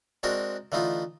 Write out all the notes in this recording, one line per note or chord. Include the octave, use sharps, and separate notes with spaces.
G#3 C4 D4 F#4 A#4
D3 E3 A3 D#4 F4